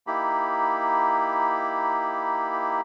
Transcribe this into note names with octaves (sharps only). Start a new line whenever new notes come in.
A#3 D#4 E4 G4 B5